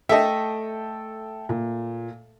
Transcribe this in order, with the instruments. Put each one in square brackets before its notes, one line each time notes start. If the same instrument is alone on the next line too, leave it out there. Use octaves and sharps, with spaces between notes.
[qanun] A3 [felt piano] A4 G5 [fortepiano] D#5 E5
[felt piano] A#2